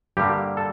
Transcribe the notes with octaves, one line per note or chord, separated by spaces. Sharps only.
G2 D3 G3 A#3 G4
A4